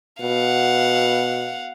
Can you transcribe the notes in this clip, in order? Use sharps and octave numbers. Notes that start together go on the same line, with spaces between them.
B2 F5 F#5